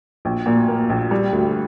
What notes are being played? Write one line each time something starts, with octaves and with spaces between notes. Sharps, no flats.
A#1
A#2
A#3
A#1
G3
D2